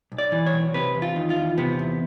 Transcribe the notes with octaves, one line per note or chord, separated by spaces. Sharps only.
B1
D5
E3
C#5
B1
C3 B4
E2
F4
D#3
F4
E2
C3 B3
E2